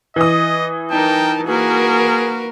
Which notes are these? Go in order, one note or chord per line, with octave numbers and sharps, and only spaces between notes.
E3 D#5 D#6
D#4 A#4 G5 A5
A#3 F#4 G#4 A#4 B4